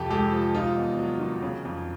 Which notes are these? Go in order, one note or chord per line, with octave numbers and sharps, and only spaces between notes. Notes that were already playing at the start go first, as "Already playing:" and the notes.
Already playing: F2 C3 G4 A4
G#3 G4 A4
F3
C3 D#4 F4
E2
F#3
D#3
C#3
F2